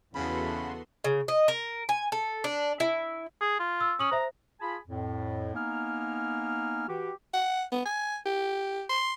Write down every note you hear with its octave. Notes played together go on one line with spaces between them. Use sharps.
E2 C#3 B3 F#4 A4 B5 C6
C#3
D#5
A#4
G#5
A4
D4
E4
G#4
F4
E6
C#4 D#6 F#7
C5 E5 A#5
F4 G#4 G#5 A5 B5
F2 A2
A#3 B3 D#4 G#5 F6
E3 F#4 G4
F#5
B3
G#5
G4
C6